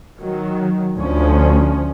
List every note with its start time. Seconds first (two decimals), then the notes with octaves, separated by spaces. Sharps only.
0.18 D#3 F#3
0.96 D2 F3 C#4